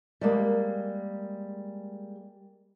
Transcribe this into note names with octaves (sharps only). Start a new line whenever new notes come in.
G3 G#3 A#3